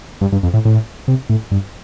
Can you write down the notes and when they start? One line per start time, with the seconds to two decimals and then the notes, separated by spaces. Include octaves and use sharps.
0.21 G2
0.32 G2
0.43 F2
0.54 A2
0.65 A2
1.08 C3
1.30 A2
1.51 G2